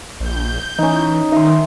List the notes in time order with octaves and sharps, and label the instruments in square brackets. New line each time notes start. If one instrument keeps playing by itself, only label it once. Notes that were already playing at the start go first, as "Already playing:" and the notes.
[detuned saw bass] A#1 [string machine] G6
[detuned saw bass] E3 [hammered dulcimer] C#4 D#4
[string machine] D#3 [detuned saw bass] D#4 [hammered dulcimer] E5 C6